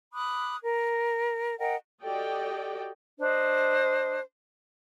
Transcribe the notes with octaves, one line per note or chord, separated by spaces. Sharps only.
B5 D6 D#6 F#6
A#4
A#4 D#5 F#5 G5
F#4 G4 A4 D5 D#5 G5
D4 C5 D#5